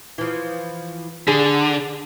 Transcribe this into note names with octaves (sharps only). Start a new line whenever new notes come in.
E3 F3
D3 G#4